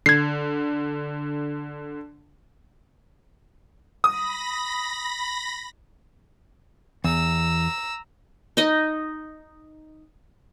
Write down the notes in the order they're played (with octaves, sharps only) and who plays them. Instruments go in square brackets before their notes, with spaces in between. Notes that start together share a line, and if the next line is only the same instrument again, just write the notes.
[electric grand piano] D3 [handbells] G#6 C7
[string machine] B5 A#6 [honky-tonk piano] D#6
[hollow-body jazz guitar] E2 [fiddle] A#5 E6
[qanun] D#4 D#5